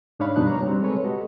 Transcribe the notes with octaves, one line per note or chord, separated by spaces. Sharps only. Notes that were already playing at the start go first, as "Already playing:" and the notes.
G#2 D4 D#4 C#5 F5 B5
F#2 B2 G3 D4 D#4 F#6
C#5 A#5
G3 C4
G#3 A4 B4 C#5
F#4 G4 A4 D#5